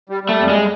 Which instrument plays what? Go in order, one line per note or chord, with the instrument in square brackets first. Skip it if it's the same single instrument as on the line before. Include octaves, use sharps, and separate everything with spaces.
[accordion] G3
G3
[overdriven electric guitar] A3
[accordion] F2
[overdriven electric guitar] G#3